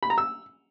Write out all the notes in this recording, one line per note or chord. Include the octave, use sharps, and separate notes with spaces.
B5
A#5
E6